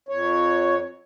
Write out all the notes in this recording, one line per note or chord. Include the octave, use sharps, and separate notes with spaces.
F2 C#5